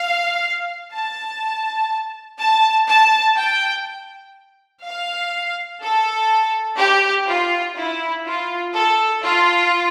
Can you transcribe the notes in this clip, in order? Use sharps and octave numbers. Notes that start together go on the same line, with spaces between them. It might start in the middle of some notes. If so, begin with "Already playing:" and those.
Already playing: F5
A5
A5
A5
G5
F5
A4
G4
F4
E4
F4
A4
F4